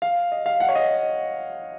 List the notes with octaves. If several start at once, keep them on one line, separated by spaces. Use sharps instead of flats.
F5
D#5
F5
F#5
C#5
D#5